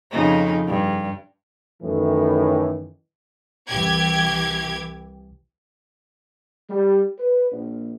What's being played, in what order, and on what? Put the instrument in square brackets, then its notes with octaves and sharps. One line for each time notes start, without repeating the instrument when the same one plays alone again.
[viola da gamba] F2 C#3 D#4
G2
[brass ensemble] F#2 A2 D#3 E3
[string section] C2 E3 G4 G#6
[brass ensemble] G3
B4
A#1